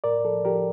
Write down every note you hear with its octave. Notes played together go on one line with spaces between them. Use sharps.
A2 A#4 D5
F3 A4
F3 G4 A#4